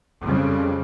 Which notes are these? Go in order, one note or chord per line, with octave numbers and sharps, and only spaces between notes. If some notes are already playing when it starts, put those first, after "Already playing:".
F2 C#3 G3